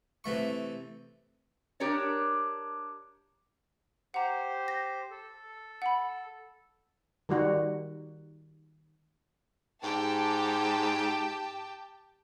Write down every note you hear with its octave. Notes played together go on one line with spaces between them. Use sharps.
C3 E3 A3 C#6
D4 G4 A#4 C#5 D5
G4 C5 F#5 A#5
A#6
A4
F#5 B5
D#3 G3 F#4
G#2 G4 G5 A5